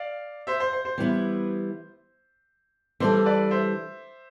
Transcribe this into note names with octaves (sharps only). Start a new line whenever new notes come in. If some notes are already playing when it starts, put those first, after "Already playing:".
Already playing: D5 F5
C5 E5
C5
C5
C5
E3 G3 B3 E4 B4
E3 G3 D4 A4 C5
B4 D5
C5 E5